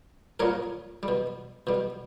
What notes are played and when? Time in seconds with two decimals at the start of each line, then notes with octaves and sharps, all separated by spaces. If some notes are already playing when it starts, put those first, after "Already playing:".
0.40 A#2 G3 A#4 C#5
1.03 G3
1.08 B2
1.67 B2 G3